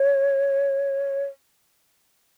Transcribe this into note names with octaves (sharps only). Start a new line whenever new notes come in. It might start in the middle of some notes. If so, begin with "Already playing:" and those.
Already playing: C#5